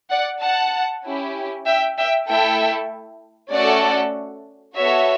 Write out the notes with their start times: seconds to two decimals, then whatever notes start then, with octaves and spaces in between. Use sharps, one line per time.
0.10 D5 F#5
0.41 F#5 A5
1.04 C#4 E4 G4
1.66 E5 G5
1.97 E5 G5
2.27 A3 E4 A4 E5 G5
3.52 A3 C#4 F#4 A4 D5 F#5
4.76 B3 F#4 A4 C#5 E5